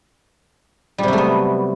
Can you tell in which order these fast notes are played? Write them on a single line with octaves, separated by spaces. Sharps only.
G3 C3 F#3 A3 B3